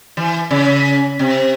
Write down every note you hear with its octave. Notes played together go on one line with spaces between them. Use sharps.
E3
C#3
C3